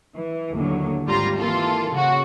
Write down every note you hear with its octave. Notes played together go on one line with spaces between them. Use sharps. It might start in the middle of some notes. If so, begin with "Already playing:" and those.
E3
D#2 A2 D3 F#3
G#1 G3 F4 A#5
E3 A#3 F4 A4
C#3 F#4